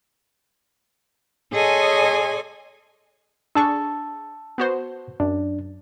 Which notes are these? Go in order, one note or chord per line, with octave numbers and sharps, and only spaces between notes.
G#4 A4 C#5 D#5 G#5 C6
D4 G#4 A5 C#6 E6
B3 F#4 C5
F#2 D4